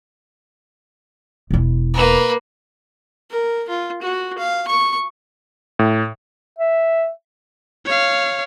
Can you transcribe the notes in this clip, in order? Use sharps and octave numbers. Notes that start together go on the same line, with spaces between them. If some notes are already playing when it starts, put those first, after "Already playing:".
E1 E4
A#3 B4
A#4
F4
F#4
F5
C#6
A2
E5
C#5 F5